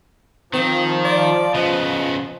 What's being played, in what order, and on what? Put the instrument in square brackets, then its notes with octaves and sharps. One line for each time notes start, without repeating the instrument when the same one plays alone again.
[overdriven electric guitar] D#3 [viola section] F3 [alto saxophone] C4
[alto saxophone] D5
[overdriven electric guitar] C#3 B3 [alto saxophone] D#5